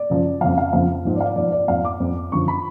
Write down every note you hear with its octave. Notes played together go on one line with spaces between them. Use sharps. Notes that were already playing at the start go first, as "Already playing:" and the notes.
Already playing: D5
F#2 C#3 F3
F2 C#3 F3 F5
F5
F2 C#3 F3 F5
G#2 F3
D5
F5
D5
G#2 F3 D5
D5
F2 F3 F5
D6
F2 F3
F#2 D3 F3 C#6
B5